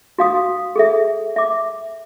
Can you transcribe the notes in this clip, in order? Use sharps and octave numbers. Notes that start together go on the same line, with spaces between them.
F#4 F5 D#6
G#4 A4 E5
E5 D6